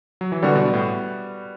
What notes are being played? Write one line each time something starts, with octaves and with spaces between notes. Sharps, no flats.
F#3
E3
D3 G3 B3 F#4
B2
A2